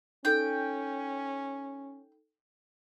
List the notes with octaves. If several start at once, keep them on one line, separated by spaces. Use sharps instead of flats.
C#4 D#4 A4 G5